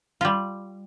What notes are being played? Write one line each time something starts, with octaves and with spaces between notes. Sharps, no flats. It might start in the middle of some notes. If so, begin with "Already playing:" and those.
G3 F4